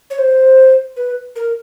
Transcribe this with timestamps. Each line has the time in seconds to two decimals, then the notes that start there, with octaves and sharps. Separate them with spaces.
0.10 C#5
0.18 C5
0.96 B4
1.36 A#4